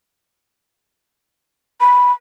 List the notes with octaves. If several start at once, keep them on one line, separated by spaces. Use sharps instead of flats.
B5